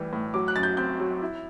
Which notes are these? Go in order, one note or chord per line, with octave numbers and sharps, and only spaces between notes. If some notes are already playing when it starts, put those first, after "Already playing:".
Already playing: A2 E3 G3
A2
F#3 D6
F#6
F#2 A6
G6
C4 G6
F#3
E4